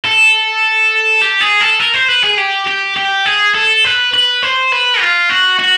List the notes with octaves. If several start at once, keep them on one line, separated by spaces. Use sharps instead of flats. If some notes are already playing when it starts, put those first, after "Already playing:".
A4
G4
G#4
A4
A#4
C5
B4
G#4
G4
G4
G4
G#4
A4
B4
B4
C5
B4
F4
F#4
F#4